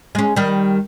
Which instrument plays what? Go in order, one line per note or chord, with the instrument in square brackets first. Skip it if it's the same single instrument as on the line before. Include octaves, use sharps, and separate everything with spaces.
[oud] G#3 C#4
D#3 G3